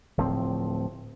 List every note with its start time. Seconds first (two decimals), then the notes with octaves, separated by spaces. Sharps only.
0.17 D1 A2 F3 C4